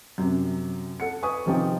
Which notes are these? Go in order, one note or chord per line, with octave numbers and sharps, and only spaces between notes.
F#2 C3
A4 F#5 C#7
B4 G#5 C#6 D#6
C3 D#3 F3 G4 C5 G5